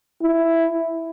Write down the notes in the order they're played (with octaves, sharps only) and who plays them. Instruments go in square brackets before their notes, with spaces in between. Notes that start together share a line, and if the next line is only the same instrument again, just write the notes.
[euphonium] E4